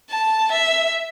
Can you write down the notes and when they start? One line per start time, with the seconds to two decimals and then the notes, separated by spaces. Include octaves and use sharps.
0.10 A5
0.51 E5